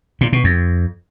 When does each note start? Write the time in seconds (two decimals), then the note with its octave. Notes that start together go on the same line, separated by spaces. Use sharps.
0.21 A#2
0.33 B2
0.44 F2